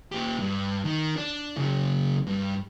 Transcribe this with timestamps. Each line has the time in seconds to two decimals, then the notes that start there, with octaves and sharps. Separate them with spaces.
0.12 A#2 G4
0.39 G2
0.85 D#3
1.16 D4
1.57 C#3 F#3
2.27 G2